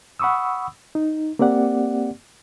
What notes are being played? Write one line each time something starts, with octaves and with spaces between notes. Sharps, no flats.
F#5 B5 C#6 D#6 E6
D#4
A#3 C4 G4 D5 F#5